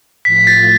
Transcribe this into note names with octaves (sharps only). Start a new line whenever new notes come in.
A2 F3 A3 F4 B6
A6